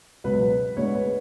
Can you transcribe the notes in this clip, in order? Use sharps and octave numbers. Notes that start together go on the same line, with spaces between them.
C#2 B2 F#3 B4
D2 D3 G#3 B3 C#5
B4